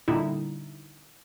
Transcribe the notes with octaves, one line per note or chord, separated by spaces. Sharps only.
A#2 D3 G3 D#4 E4